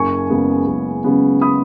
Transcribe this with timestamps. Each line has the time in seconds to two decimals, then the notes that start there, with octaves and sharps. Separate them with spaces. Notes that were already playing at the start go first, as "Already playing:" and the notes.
Already playing: F#1 G#5 C#6
0.30 F#2 C#3 G#3 B3
0.67 F#1
1.04 F#2 C#3 G#3 B3
1.41 B5 D#6